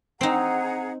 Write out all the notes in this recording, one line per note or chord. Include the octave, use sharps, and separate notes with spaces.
C4 D#4 G#4 F#5 A#5